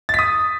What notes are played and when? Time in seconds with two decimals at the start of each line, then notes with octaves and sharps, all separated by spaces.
0.09 A6
0.14 B6
0.19 D#6